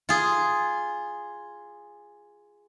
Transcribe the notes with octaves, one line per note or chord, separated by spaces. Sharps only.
F4 G#4